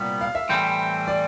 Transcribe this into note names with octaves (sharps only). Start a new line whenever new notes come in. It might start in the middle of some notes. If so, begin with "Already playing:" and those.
Already playing: C2 A#2 G3 B3 F5
F5
E5
A2 E3 G3 C4
D5